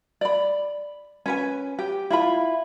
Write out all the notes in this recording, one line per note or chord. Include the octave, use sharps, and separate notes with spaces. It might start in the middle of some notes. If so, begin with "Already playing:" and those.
D5 B5
C#4 B4 G#5
G4
E4 F4 B5